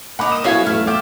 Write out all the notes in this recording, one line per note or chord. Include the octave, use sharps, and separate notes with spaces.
A#3 D#4 F#5 B5 D6
D#5 D#6 E7
B1 B3 C#4 E4 F#4 C#5 F5 G#5
E2 A3 F6
F4 E5 G5 D6